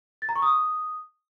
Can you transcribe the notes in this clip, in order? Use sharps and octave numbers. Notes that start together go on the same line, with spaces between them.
A6
A#5
C#6
D#6